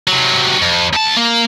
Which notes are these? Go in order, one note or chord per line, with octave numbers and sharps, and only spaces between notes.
C3 F#3
F2
D2 A5
A#3